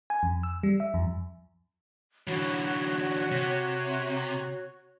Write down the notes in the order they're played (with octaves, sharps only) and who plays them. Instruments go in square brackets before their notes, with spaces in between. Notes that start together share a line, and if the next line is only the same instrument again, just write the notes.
[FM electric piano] G#5
F2
E6
G3
E5
F2
[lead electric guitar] D3 E3 [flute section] F#4 C#5
[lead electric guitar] C3